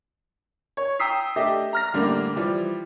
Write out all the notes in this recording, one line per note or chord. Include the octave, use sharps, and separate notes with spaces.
C#5
G5 A#5 D#6 E6 B6 C7
A3 D4 G4 D#5 E5
A#5 F6 A#6
F#2 A2 D3 G3 A#3
E3 F3 G3